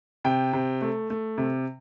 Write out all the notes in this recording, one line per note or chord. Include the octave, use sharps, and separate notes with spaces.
C3 G5
C3
A3
A3
C3